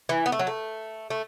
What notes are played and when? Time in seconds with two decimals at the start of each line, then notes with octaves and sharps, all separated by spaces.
0.09 E3
0.26 B3
0.32 A3
0.39 F#3
0.47 A3
1.10 A3